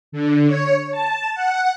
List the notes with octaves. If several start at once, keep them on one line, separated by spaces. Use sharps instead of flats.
D3
C#5
A5
F#5